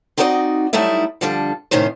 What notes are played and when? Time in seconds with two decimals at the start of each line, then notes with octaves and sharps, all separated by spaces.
0.17 C4 D#4 F#4 A#4 D5 D#5
0.73 F#3 G3 A3 D#4 E4 E5
1.21 D3 F3 G3 D4 A4
1.71 A2 C3 D#3 C#4 D#4 C5